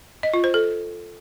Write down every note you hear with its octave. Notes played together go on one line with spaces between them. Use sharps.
D#5
F4
C5
A4